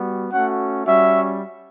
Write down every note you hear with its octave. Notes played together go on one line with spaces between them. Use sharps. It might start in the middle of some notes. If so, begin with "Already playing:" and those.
Already playing: G3 B3 F#4
A3 C#4 F#4 F#5
G3 C#4 F#4 E5